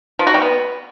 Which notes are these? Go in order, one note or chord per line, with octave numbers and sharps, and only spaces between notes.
F3
F#4
G3
B3